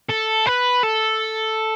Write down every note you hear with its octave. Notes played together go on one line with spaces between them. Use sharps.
A4
B4
A4